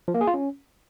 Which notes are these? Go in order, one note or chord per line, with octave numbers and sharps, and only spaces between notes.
F3
A#3
G#4
F4
C#4